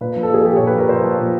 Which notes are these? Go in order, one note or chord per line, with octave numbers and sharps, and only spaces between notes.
A#2 B4
F3
A4
A#2 G#4
F3 G4
A#2 C#5
B4
F3 A#4
A#2 C5
F3
A#2